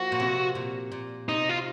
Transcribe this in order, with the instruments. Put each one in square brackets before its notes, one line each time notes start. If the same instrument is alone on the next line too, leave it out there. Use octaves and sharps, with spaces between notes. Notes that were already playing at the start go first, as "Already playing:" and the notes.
Already playing: [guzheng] F3 A#3 [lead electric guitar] F#4
[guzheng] A#2
C3
A#2
A#2
[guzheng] C3 [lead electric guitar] D#4
[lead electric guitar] F4